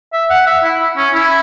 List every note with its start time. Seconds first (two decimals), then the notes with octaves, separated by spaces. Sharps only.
0.13 E5
0.30 F#5
0.47 E5
0.64 E4
0.97 C#4
1.14 E4